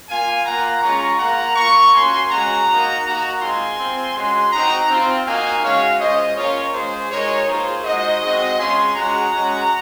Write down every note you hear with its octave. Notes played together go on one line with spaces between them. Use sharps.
A#3 F4 F5 G#5
A#3 F4 F#5 A#5
G#3 C#4 F4 A#5 C#6
A#3 F4 F#5 A#5
A#3 F4 A#5 C#6
A#3 C#4 F#4 G#5 C6
G#3 C#4 F#4 F#5 A#5
A#3 D#4 F#4
A#3 D#4 F#4
G#3 C4 F4 G#5 C6
C4 F4
G#3 C#4 F#4 G#5 C6
C4 D#4 F#4 F#5 A#5
C4 F4
A#3 D#4 F#4 F5 G#5
G#3 C#4 F#4 C#5 F5
G#3 C#4 F4 C5 D#5
A#3 C#4 F4 A#4 C#5
G#3 C#4 F4 G#4 C5
G#3 D#4 F#4 A#4 C#5
A#3 F4 G#4 C5
G#3 D#4 F#4 C5 D#5
G#3 C4 F#4
G#3 C#4 F4 G#5 C6
G#3 C#4 F#4 F#5 A#5
G#3 C#4 F#4